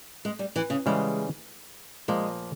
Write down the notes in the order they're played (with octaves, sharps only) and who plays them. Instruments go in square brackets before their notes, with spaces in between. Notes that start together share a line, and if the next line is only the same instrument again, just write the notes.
[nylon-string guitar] G#3
G3
E3
C#3
[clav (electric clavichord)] C#3 E3 G3 [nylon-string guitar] G#3
[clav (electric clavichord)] A#2 F3 A#3 [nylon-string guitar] G#3